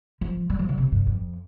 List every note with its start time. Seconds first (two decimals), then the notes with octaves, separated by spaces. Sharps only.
0.21 F3
0.50 G3
0.59 F3
0.69 D3
0.78 C3
0.92 G2
1.07 F2